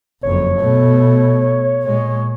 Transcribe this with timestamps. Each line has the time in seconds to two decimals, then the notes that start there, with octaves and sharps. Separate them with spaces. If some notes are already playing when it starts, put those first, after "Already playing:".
0.23 F#1 F2 C#5
0.60 B2 A3
1.82 A#2 G#3